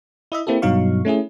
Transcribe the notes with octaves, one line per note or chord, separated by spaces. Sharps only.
E4 D#5 E5
A#3 C4 E4 G4 A4
G2 B2 F#3 D#4 F5 C#6
A3 C#4 E4 G#4